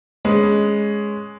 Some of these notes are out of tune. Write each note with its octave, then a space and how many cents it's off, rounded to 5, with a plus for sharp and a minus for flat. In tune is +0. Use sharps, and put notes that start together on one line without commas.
G#3 +0 C#4 +0 B4 +0